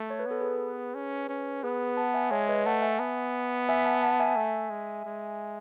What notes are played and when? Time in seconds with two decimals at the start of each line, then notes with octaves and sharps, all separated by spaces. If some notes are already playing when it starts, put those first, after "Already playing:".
Already playing: A3
0.10 C#5
0.19 B4
0.26 B3 A4
0.40 G#4 B4
0.95 C#4
1.29 C#4
1.63 B3 G#4 B4
1.97 F#5 A5
2.14 E5 G#5
2.31 G#3 C#5 E5
2.48 B4 D#5
2.66 A3 F#5 A5
2.82 E5 G#5
3.00 B3
3.69 E5 G#5
3.85 F#5 A5
4.02 F#5 A5
4.20 E5 G#5
4.36 A3
4.70 G#3
5.05 G#3